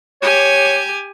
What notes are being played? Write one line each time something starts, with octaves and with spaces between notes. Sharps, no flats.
G4 C#5 G#5